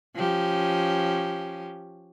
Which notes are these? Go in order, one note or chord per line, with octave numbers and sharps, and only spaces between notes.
F3 C#4 G4